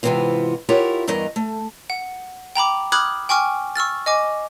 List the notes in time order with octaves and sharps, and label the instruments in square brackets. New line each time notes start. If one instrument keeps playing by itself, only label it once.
[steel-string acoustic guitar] G#2 C3 E3 B3 C4 F4
E4 F4 G4 A#4 C#5 F#5
E2 G2 E3 A#4 D#5
A3
[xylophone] F#5
G5 A#5 B5 D6
B5 D6 D#6 F6 F#6 G#6
G5 G#5 C#6 D6 F6
C#6 E6 F6 A6
D#5 G#5 D6